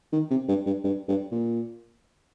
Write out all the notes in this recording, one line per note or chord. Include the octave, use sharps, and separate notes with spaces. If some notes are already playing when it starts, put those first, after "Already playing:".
D#3
C3
G2
G2
G2
G2
A#2